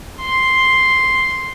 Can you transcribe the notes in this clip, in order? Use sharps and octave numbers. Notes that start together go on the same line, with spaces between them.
C6